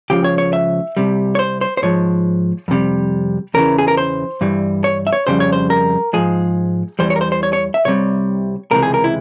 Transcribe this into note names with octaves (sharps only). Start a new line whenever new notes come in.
C#2 C#3 F3 G4
C#5
C#5
E5
C2 C3 G3
C#5
C5
C5
C5
G#2 F3 G#3 C#5
F2 C3 G3
E2 C#3 E3 A#4
G#4
A#4
C5
G2 E3 G3
C#5
E5
C#5
F2 C#3 G3 C5
C#5
C5
A#4
G#2 F3 G#3 G#4
E2 E3 G3 C5
C#5
A#4
C5
C5
C#5
C#5
E5
C2 C3 G3 C#5
C#2 C3 E3 G#3 A#4
G#4
A#4
E4